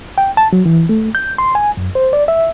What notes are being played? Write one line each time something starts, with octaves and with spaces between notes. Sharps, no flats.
G5
A5
F#3
E3
A3
G6
C6
G#5
F#2
C5
D5
E5